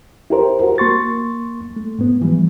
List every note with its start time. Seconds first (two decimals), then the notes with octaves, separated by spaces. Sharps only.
0.30 E4 G4 A#4 C5
0.62 F#4 A#4
0.78 A#3 C6 C#6 A6
1.76 A3
1.99 G#2 B3
2.22 E3 F3 G3